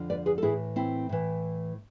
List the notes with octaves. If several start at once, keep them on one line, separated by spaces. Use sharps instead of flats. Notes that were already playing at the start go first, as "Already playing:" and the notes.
Already playing: F2 D3 F3
B4 D5
G#4 B4
A4
A2 E3 E4 G#4
C4 E4
A2 E3